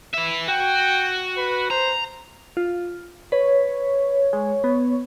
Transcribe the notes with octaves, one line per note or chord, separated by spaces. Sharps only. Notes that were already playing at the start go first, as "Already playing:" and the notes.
B4 E5
F#4 G5
B4
C5 A#5
F4
B4 C#5
G#3
B3